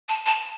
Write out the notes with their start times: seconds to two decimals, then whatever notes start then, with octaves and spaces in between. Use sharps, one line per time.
0.09 A5
0.26 A5